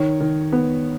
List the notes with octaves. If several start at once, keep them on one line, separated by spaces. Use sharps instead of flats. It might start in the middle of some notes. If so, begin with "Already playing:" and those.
Already playing: D#3 C#5
D#3
B3